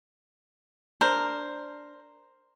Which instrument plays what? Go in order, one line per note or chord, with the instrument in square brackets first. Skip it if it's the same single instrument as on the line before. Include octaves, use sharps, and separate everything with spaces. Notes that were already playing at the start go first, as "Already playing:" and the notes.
[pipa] D4 A#4 [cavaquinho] C5